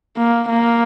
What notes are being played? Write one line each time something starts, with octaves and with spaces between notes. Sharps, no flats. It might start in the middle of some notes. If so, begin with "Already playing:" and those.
A#3
A#3